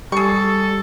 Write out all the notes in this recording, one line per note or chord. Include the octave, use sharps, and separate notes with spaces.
G3 G#4 A4 C#6